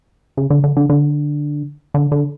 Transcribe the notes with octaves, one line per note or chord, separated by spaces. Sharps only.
C#3
D3
D3
D3
D3
D3
D3